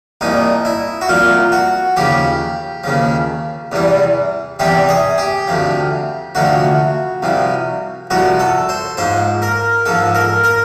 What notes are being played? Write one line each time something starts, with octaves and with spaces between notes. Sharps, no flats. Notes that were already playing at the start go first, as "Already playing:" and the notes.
C2 A#2 F3 D#4
E4
F#4
C2 A#2 F3 F4
F#4
D#2 C#3 F3 G4
D#2 C#3 F3
E2 C3 E3 G3
E2 C3 E3 G3 G4
G#4
G4
D2 C3 F3
D2 C3 F3 F#4
C2 C3 F3
C2 C3 F3 F#4
A4
C5
G#2 F3 C5
A#4
G#2 F3 A4
A#4
A#4